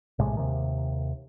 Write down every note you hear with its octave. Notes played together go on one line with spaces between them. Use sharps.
A#1 A2 C3 G#3
D#2 C3 D#3